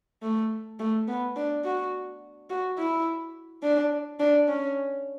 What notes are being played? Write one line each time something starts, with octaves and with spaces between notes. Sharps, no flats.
A3
A3
B3
D4
F#4
F#4
E4
D4
D4
C#4